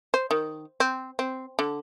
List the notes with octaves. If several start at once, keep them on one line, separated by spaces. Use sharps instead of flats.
C5
D#3
C4
C4
D3